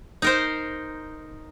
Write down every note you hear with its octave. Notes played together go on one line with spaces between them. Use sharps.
D#4 A#4 C5